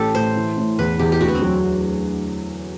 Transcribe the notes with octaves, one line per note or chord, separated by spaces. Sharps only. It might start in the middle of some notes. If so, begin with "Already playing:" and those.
Already playing: A1 A2 G4 A4
A2 C5
E3
A2
E2 B4
E2 G4
G4
D2 F#4
B3
C4
F#3